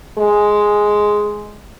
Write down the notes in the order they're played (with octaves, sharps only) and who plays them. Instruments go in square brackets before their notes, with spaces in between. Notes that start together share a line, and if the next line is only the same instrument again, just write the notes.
[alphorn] G#3